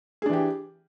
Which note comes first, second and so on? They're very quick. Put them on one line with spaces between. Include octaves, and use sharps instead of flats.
G#4 D4 E3 G4